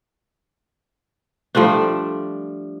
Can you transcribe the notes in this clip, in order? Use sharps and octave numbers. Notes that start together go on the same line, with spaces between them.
F3 G3 A3 D4